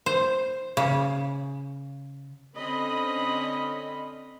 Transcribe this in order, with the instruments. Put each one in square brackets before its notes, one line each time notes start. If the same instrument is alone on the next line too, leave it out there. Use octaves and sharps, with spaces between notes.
[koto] C5
C#3
[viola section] D3 C4 C#4 D#5 B5